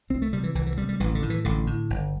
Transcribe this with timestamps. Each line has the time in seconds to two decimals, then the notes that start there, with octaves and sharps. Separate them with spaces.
0.10 C2 C4
0.22 A3
0.33 C3 G3
0.43 E3
0.55 C2 E3
0.67 E3
0.78 C3 G3
0.89 G3
1.00 A1 E3
1.15 D3
1.22 A2
1.30 E3
1.45 A1 D3
1.67 A2
1.90 G1